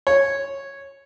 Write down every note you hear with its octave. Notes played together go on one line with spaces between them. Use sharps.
C#5